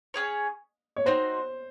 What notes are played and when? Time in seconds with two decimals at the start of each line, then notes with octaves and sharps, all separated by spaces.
0.14 C#4 G#4 C#5
0.96 C#5
1.06 C4 D#4 F#4 C5